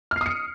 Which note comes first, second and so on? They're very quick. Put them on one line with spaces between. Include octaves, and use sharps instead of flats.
F6 C7 D#6 C#7